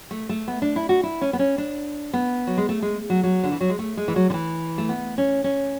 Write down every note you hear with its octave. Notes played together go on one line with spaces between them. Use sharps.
A3
A3
B3
D4
E4
F#4
E4
C#4
B3
C#4
D4
B3
F#3
G#3
A3
G#3
F#3
F#3
D3
E3
F#3
G#3
A3
G#3
E3
F#3
D3
E3
A3
B3
C#4
C#4